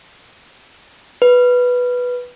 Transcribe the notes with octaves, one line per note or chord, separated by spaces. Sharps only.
B4